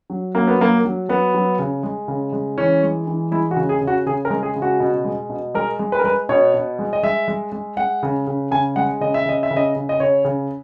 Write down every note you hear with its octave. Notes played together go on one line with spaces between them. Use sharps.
F#3
F#3 A#3
B3
F#3 A#3
F#3
F#3 B3
F#3
C#3
G#3
C#3
G#3
E3 C#4
G#3
E3
G#3 E4
F#4
C#3
G#4
C#3
F#4
C#3 G#4
A#4
G#3
G#4
C#3
F#4
B2
G#3
B2
G#3 A#4
G#3
B4
A#4
G#3 B4
B2 C#5
B2
G#3
D#5
G#3 E5
G#3
G#3
G#3 F#5
C#3
C#3
C#3 G#5
G#3 F#5
C#3 D#5
E5
C#3 D#5
E5
C#3
D#5
C#3
D#5
C#3 C#5
C#3